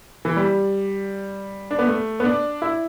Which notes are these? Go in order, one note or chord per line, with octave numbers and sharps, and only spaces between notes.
E3
G3
D4
B3
A3
B3
D4
E4